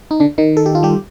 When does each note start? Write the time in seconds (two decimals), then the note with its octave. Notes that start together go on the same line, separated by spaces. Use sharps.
0.11 D#4
0.20 D3 D4
0.38 D#3 D#4
0.57 A4
0.66 G4
0.75 F4
0.83 G3 G4